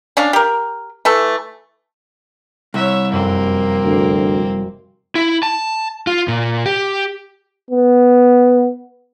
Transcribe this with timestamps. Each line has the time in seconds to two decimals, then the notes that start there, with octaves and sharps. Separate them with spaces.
0.17 C#4 D4 F5
0.33 G4 A#4
1.05 E3 A3 A4
2.74 C2 C#5 E5
3.12 F1 F#2 A#3 C4
3.85 D2
5.15 E4
5.43 A5
6.07 F4
6.28 A#2
6.66 G4
7.71 B3